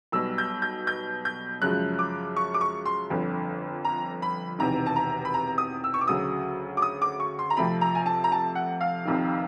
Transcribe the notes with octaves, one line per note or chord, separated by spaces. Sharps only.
B1 B2 G3 E6
G6
G6
G6
G6
F#2 C#3 F3 G#3 F#6
D6
C#6
D6
C#6
C6
G1 F2 D3
A#5
B5
E1 E2 C3 D#3 A#5
A5
A#5
B5
A#5
D#6
E6
C#6
D6
D2 C#3 F#3 D#6
D6
D#6
D6
C#6
C6
A#5
F2 C3 F3 A3 C4 B5
A#5
G#5
A5
A#5
A5
F#5
F5
F1 F2 C3 D#3